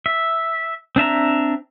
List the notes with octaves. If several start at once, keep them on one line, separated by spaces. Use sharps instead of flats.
E5
C4 D4 E5 A#5